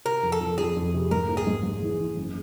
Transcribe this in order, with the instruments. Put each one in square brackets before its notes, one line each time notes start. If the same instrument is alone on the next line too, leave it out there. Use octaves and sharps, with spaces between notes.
[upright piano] C3 [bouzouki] A#4
[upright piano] F2
[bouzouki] A4
[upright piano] F2
[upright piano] F2 [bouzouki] G#4
[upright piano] F2
C3
[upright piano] G#2 [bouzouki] A#4
[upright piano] A#1
[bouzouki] G#4
[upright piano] G#2
G#2
E3
E3
F#1